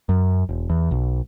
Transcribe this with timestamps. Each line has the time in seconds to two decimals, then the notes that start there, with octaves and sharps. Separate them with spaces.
0.09 F#2
0.49 E1
0.70 E2
0.91 B1